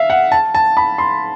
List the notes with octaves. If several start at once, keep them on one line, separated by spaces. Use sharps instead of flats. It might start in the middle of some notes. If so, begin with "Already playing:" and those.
Already playing: E5 F5
F#5
A5
A5
B5
C6